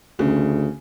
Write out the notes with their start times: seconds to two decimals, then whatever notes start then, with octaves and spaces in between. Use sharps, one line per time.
0.19 D2 C#3